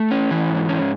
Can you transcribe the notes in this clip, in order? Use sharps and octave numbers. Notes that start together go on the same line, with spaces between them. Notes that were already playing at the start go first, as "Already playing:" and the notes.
Already playing: A3
C#4
E3
G#2
C#4